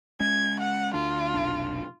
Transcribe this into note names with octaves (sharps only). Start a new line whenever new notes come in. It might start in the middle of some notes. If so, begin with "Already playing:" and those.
G#3 C#4 G#6
F#5
D2 D4 F4
F1 B1 D4